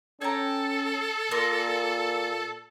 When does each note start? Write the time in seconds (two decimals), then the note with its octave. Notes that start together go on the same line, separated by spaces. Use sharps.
0.21 C#4 A4 C#5 G5 A#5
1.31 A#2 A#4 D5 C6